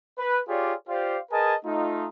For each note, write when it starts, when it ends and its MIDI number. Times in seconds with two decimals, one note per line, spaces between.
0.19 0.40 71
0.49 0.73 65
0.49 0.73 67
0.49 0.73 68
0.49 0.73 73
0.49 0.73 74
0.88 1.18 65
0.88 1.18 67
0.88 1.18 72
0.88 1.18 74
0.88 1.18 77
1.32 1.55 68
1.32 1.55 70
1.32 1.55 71
1.32 1.55 75
1.32 1.55 80
1.32 1.55 81
1.66 2.09 57
1.66 2.09 63
1.66 2.09 65